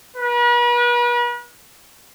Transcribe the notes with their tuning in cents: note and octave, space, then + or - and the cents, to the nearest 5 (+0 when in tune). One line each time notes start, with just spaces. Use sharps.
B4 -40